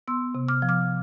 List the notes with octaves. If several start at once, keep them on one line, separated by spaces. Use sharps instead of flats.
B3 C6 E6
C3
D6 F6
F3
D6 F6